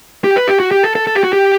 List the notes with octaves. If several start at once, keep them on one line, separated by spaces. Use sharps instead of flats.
G4
B4
G4
F#4
G4
A4
A4
A4
G4
F#4
G4